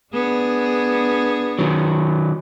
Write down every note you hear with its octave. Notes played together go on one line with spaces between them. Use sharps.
B3 D4 G#4
D#3 F#3